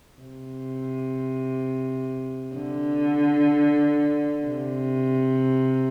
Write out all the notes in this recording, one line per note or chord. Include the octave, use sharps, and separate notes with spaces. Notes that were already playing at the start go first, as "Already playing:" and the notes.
C3
D3
C3